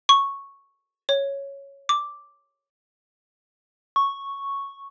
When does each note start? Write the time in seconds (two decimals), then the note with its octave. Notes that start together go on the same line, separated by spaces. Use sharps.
0.09 C#6
1.09 C#5
1.89 D6
3.96 C#6